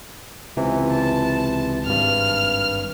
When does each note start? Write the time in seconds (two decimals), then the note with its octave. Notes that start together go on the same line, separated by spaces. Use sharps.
0.57 C#2 C3 E3
0.91 A5
1.86 G#1 G2 F6